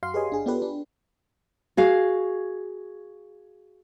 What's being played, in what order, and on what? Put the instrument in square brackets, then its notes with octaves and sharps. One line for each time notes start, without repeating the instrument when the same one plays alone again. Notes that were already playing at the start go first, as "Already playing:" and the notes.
[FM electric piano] F#2 F#4 F5 C6 C7
G4 G#4 B4 C#5 D#5 G#5
G1 D4 G#4
B3 D4 F4 G4 A4 B4
D4
[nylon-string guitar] F#4 G#4 F5